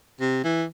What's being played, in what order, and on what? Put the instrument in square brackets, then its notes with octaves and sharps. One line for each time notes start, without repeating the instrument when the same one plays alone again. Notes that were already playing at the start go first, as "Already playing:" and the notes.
[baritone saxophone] C3
E3